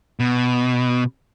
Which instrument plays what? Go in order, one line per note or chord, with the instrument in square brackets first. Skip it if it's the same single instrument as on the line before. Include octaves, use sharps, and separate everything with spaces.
[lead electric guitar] B2